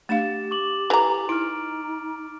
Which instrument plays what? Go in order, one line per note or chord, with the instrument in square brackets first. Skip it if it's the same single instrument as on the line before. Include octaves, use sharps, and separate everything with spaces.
[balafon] A3 D4 F5 [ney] G4 [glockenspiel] A6 E7
[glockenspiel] C#6 D6 F#7
[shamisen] E3 A#5 [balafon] A4 D6 [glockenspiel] F7
[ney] D#4 [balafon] E4 [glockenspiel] F6 D7